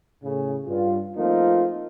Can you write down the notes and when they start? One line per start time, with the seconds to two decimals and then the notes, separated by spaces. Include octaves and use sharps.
0.23 A2 C#3
0.67 G2 F4
1.17 F3 A3 A#3 C4 D#4 F4